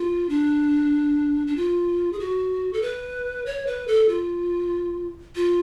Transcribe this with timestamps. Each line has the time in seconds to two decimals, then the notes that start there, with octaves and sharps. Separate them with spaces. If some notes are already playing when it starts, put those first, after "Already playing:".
Already playing: F4
0.29 D4
1.47 D4
1.57 F4
2.13 G#4
2.19 F#4
2.73 A4
2.82 B4
3.46 C#5
3.67 B4
3.88 A4
4.09 F4
5.36 F4